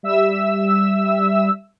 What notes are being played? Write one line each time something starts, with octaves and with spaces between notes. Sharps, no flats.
G3 E5 E6